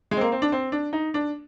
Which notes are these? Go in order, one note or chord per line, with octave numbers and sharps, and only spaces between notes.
G#3
C4
A#3
C4
D4
C4
D4
D#4
D4